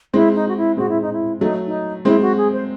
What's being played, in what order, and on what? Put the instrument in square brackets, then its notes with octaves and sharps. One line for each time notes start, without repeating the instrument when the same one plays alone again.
[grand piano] G#3 C4 [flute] E4
[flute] D#4
F#4
E4
[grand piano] G#3 C4 [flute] F#4
[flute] E4
D#4
E4
[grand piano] F#3 A3 [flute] D#4
[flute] D#4
[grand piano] G#3 C4 [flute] E4
[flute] F#4
G#4
C5